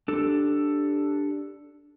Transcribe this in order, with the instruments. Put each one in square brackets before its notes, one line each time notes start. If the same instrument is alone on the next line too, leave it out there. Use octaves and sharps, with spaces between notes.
[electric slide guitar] D4 G4 A4